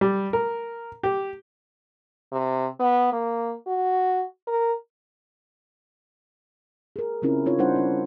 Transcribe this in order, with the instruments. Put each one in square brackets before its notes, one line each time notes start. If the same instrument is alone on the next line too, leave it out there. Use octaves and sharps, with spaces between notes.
[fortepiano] G3
A#4
G4
[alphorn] C3
B3
A#3
F#4
A#4
[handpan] G#4 A#4
C#3 C4 C#4 E4 F4 A#4
C4 D#4 F4 C#5
G3 D4 E4 C5 F#5
C#4 D#4